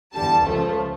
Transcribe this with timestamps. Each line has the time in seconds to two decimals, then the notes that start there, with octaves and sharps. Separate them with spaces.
0.14 E2 D3 G3 A5
0.43 C#2 C#3 F3 A3